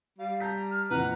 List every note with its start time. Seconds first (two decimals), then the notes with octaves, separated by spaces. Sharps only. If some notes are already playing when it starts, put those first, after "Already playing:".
0.19 G3 F5
0.40 A5 A#5 G6 B6
0.71 F6
0.91 F2 A#2 E3 B4 F#5 A#5